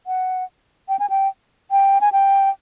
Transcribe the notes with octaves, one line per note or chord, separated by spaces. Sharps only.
F#5
G5
G#5
G5
G5
G#5
G5